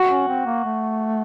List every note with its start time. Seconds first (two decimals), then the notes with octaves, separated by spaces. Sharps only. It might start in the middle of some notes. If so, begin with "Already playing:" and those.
Already playing: F#4
0.09 C#4
0.28 C4
0.46 A#3
0.65 A3